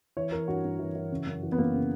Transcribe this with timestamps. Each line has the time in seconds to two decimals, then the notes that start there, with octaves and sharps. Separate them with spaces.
0.17 E3 C#5
0.32 E3 A#4
0.48 G2 F#4
0.64 G2
0.79 E3
0.95 E3
1.12 C#3
1.27 F#2
1.43 E3
1.52 B3
1.58 F#2 A#3
1.74 C#3